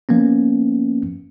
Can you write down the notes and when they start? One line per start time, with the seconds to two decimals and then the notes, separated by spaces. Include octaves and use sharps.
0.09 F3 A#3 B3 C#4